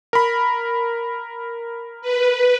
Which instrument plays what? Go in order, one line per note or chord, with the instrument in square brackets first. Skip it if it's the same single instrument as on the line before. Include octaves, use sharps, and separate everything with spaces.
[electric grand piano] A#4 B5
[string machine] B4